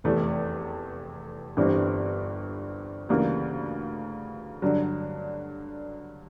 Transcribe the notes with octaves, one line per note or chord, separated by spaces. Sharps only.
F1 E2 C3 E3 A3
G1 G2 E3 G3 C4
D2 C#3 E3 G3 A#3
G2 D3 F#3